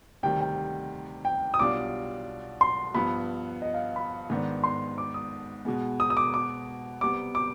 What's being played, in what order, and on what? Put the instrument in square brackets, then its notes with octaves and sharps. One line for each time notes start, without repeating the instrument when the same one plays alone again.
[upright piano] D2 C3 D#3 G3 [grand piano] G5
[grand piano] G5
G5
D#6
[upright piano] B1 B2 G3 D4 F4 [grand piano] D6
[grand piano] C6
[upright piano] G2 F3 B3 [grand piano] B5
[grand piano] D#5
F5
B5
[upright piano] G#2 D#3 B3 D4
[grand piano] C6
D6
D#6
[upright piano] B2 G#3 B3
[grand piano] D#6
D#6
D6
D6
[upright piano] C3 G3 B3 [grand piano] D6
[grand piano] D6